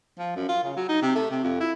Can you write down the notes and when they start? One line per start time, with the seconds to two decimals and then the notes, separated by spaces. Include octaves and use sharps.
0.19 F3
0.36 F#2
0.49 F4
0.63 C#3
0.77 F#3
0.89 D#4
1.02 C3
1.15 A3
1.31 C3
1.44 F2
1.60 E4